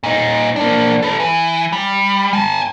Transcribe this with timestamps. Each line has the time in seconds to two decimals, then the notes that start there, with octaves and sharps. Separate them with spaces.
0.03 A#2 D#4
0.56 A#3 D4
1.03 A4 B4
1.20 E3
1.73 G3
2.33 G#5 A5